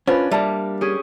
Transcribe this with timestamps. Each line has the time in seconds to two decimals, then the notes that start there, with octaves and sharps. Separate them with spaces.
0.07 C#4 D4 F4 B4 C5
0.31 G3 A#3 E5 A5
0.81 C#4 G4 G#4